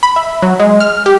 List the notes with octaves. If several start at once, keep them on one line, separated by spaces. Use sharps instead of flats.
B5
E5
F#3
G#3
F6
G4